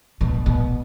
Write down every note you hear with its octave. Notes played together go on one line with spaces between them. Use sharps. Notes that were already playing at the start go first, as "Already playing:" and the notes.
B2
B2